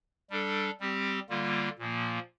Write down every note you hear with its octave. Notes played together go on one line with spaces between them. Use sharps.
G3 D4 A4
G3 C4 G4
D3 G3 A#3 F4
A#2 F3 A#3